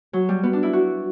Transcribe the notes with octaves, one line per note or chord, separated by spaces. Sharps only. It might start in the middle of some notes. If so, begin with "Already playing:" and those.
F#3
G3
B3
D4
E4
F#4